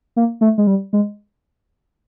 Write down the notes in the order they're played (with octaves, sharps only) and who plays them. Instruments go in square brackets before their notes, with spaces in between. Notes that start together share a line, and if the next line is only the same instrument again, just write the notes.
[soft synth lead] A#3
A3
G#3
G3
G#3